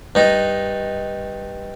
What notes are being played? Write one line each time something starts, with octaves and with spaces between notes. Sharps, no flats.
G2 D#4